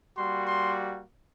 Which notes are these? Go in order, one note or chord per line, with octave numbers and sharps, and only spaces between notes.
G3 A#3 F#4 C6
C6